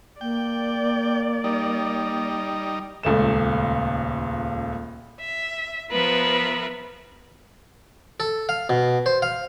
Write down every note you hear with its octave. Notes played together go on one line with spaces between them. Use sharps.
A#3 D5 G5
G3 D#4
D#1 C#2 A3 E7
E5
F3 B3 A#4 B4 E5
A4
F5
B2
C5
F5